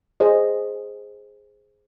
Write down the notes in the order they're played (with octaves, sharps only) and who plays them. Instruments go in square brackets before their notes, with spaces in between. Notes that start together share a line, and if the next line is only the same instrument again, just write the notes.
[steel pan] G#4 C5 D#5